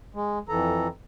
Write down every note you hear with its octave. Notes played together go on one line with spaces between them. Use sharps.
G#3
F2 E3 A4 A#5